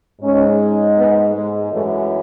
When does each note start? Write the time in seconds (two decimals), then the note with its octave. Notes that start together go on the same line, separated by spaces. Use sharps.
0.21 G#2 G#3 C#4
0.96 B3
1.34 G#3
1.71 F#2 E3 G#3 A3